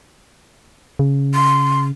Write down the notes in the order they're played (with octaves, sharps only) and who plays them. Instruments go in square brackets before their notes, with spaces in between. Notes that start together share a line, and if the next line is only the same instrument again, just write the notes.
[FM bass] C#3
[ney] C6